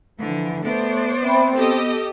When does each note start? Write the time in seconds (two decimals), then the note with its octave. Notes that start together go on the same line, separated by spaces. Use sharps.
0.20 D3 E3 F3
0.65 A3 B3 C5 D5
1.24 C4 E5 G5 B5
1.56 B3 G4 A4 D#5